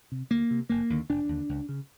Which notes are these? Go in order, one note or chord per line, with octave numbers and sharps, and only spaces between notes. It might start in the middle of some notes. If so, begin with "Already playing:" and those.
C3
D2 A#3
C3
F1 A#3
D#2 D3
F1 D4
D#2 D3
C#2
C#3